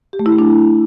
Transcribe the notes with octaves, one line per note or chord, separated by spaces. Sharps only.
G4
A3
E4
A3
D4